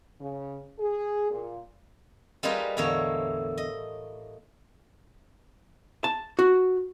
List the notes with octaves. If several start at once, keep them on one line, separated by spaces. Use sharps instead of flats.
C#3
G#4
A#2
G3 A#3 D#4 F4 G#4 B4
E2 A2 D3 A#3 C#5
D#5
A5
F#4